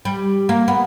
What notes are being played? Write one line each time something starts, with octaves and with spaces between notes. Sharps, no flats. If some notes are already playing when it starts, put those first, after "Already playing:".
G3
A#3
B3